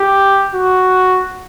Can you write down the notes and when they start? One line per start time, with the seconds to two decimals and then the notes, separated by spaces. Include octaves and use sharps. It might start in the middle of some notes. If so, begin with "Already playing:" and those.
Already playing: G4
0.55 F#4